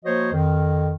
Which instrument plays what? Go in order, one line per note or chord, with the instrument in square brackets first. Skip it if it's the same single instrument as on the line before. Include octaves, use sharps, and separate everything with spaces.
[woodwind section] F3 A#3 F#4 C5 C#5 D#5
F2 D#3